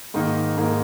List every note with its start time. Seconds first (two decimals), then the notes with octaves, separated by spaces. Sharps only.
0.14 G#2 D#3 A#3 D#4
0.58 G#2 D#3 A#3 D#4